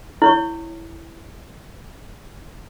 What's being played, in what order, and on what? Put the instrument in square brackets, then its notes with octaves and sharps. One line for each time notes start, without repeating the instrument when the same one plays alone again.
[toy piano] E4 C#5 C#6